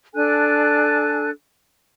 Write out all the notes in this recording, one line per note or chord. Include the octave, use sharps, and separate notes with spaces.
D4 A4 G#5 F#6